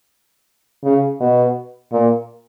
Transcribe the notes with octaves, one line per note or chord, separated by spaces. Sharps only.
C#3
B2
A#2